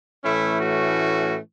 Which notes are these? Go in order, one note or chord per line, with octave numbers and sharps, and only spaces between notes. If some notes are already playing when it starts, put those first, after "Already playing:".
A2 E3 A3 C#4 E4
F#4